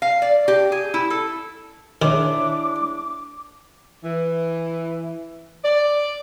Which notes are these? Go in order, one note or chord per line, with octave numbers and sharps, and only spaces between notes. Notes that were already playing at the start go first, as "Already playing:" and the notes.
F5
D5
G4
G#4
E4
A4
D#3 D4 E4 G#4 C#5 D6
E3
D5